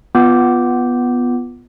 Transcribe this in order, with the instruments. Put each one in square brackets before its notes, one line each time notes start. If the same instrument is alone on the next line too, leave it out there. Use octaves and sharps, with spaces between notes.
[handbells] B3 F4 D6 G6